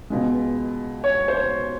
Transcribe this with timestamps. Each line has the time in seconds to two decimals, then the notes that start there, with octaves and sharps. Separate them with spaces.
0.10 C#2 B2 G#3
1.04 C#5
1.28 C5
1.35 C#5